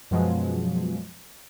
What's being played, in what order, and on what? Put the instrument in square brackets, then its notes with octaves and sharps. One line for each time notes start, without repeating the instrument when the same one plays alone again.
[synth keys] F#2 B2 F3 F#3 G#3